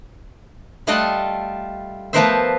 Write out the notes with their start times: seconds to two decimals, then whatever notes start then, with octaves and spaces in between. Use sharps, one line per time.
0.87 G3 A3 F4 A4 D#5 F#5
2.13 F3 A3 B3 A#4 C5 E5